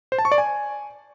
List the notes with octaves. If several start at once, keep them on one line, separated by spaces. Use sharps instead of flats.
C5
A5
C#6
D5
G#5